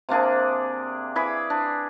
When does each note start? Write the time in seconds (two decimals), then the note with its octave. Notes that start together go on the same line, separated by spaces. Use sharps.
0.09 C3 A#3 D4 G#4
1.15 E3 G#4 B5 D6
1.50 D4